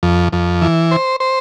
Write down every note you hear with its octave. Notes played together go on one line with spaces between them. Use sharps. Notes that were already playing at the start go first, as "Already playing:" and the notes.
F2
F2
E3
C5
C5